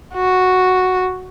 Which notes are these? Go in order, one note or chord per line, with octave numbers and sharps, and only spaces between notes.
F#4